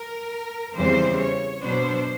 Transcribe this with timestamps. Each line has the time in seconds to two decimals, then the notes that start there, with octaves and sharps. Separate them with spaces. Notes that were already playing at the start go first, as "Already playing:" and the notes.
Already playing: A#4
0.75 E2 C#3 E3 G3 C4 C5
1.19 C#5
1.63 B2 F#3 B3 D4 C5